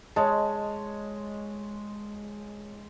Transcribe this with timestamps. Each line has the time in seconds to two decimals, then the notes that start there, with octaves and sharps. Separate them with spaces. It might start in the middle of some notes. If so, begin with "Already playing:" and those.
0.16 G#3 C#5 D#5 A5